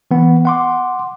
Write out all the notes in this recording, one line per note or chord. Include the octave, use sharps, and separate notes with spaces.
E3 B3
F#5 C6 D6